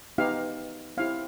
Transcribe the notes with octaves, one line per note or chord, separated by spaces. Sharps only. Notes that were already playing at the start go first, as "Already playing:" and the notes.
B3 D#4 G4 F5
C4 E4 G4 F5